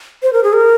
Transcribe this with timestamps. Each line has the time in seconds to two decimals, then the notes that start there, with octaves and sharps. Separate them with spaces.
0.23 C5
0.33 A#4
0.44 G#4
0.53 A#4